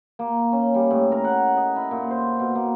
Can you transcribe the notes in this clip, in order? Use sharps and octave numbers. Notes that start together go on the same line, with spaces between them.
A#3
C#4
G3
A2
A#4
F#5
D#5
E4
A#2
C5
B2
A#3